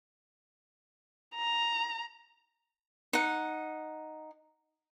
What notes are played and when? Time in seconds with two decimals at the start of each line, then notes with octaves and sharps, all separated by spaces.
1.36 A#5
3.13 D#4 F#5